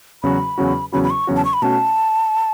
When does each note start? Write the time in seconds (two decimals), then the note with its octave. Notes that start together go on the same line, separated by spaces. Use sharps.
0.23 E2 C#3 F#3 C#4 F#4 B5
0.58 E2 C#3 F#3 C#4 F#4
0.92 E2 C#3 F#3 C#4 F#4 B5
1.04 B5
1.10 C#6
1.27 E2 C#3 F#3 C#4 F#4
1.36 A5
1.45 C#6
1.53 B5
1.62 B2 A3 C#4 F#4 A5